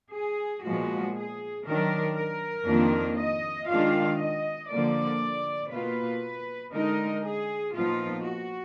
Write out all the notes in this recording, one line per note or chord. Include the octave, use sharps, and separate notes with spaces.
G#4
A#2 F3 G#3 B3 F#4
G#4
D#3 F#3 D4 A#4
A#4
F2 D#3 A#3 D4 F4
D#5
D#3 G#3 D4 F4 F5
D#5
D3 F3 A#3 D5
B2 A#3 F4 B4
D3 G#3 D#4 A#4
G#4
A#2 F3 B3 D#4 F4
F#4